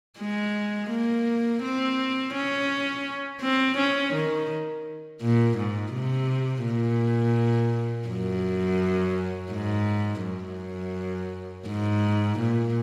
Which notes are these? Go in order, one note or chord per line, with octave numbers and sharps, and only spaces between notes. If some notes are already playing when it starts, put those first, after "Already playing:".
G#3
A#3
C4
C#4
C4
C#4
D#3
A#2
G#2
C3
A#2
F#2
G#2
F#2
G#2
A#2